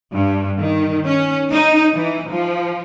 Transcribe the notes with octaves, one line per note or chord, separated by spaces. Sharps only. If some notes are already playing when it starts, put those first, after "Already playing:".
G2
D#3
C#4
D#4
E3
F3